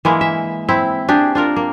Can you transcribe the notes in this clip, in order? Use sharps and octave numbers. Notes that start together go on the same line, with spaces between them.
E3 G#3 A#3 E4
E5
C4 E4
D4 G4 G#4
D4 F4 A#4
A#3